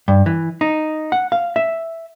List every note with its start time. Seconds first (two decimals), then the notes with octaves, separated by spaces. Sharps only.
0.08 G2
0.26 E3
0.61 D#4
1.12 F#5
1.32 F5
1.56 E5